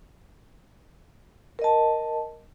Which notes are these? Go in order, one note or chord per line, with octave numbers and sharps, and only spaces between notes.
A#4 D#5 A5